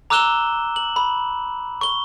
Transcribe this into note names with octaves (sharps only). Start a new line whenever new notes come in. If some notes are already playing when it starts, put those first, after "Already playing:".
A#5 D6 E6 F#6 E7 G7
F#7
B5
C#6 G7